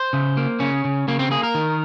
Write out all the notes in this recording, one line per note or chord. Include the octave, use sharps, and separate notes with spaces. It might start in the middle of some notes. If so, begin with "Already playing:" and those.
Already playing: C5
C#3
A#3
C#3 C#4
C#3
C#3 A#3
C4
A#3 G#4
A#4
D#3